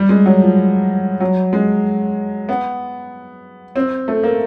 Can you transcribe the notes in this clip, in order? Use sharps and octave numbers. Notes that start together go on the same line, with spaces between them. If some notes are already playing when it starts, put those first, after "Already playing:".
Already playing: G3
G#3
F#3
F3
F#3
G#3
B3
C4
A3
A#3